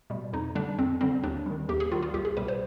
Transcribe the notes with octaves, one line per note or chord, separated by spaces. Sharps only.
B2 G3
F2 D#4
D3 G3 D4
F2 C4
D3 G3 C4
D#2 D4
D#3 G3
D#2 G4
G#4
D#3 G3 F4
F4
C2 G4
G#4
B2 G3 B4
C5